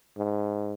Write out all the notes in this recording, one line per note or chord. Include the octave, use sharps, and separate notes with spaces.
G#2